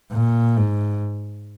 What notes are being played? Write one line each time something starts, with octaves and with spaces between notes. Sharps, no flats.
A#2
G#2